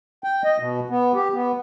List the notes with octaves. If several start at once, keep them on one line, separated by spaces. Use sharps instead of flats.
G5
D#5
B2
B3
G4
B3